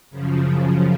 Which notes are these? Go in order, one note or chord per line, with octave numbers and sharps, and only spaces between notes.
F#2 C#3 F3